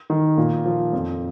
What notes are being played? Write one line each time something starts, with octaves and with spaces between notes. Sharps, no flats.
D#3
A#2
F3
F2